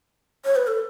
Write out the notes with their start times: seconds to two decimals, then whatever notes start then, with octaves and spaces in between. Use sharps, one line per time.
0.45 C#5
0.56 B4
0.67 A4